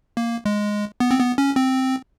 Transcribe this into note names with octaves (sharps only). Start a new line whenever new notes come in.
A#3
G#3
B3
C4
B3
C#4
C4